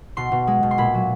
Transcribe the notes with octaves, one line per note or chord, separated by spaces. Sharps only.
B2 C6
B2
G#3
B2
C6
A#2 B5
F#3